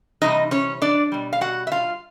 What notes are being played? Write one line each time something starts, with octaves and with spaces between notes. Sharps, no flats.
C3 E3 G3 D#4 D#5
C#4 C#5
D4 D5
B2 G3
F5
F#4 F#5
E5
F4 F5